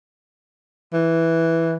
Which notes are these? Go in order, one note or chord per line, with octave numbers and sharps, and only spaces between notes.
E3